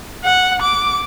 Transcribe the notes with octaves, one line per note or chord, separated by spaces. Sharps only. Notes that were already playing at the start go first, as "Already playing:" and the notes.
F#5
D6